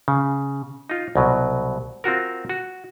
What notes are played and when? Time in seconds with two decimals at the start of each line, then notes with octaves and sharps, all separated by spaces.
0.08 C#3
0.90 D#4 F4
1.15 C2 B2 F#3
2.04 C4 F4 F#4 A#4
2.49 F#4